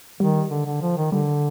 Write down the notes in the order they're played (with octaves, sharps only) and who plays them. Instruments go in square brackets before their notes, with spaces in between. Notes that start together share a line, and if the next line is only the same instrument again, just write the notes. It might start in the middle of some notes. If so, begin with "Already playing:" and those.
[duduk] D#3 [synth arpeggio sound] G3
[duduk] D3
D3
F3
D#3
[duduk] D3 [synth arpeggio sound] G3